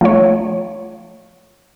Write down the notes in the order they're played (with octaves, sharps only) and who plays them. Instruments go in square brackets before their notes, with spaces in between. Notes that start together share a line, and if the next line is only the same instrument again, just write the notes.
[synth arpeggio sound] F3 A3 F4 C#5